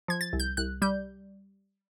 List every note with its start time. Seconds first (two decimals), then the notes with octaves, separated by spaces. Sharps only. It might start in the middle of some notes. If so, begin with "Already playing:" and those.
0.08 F3 G#6
0.21 A6
0.33 C2
0.40 G6
0.57 C2 F#6
0.82 G3 G6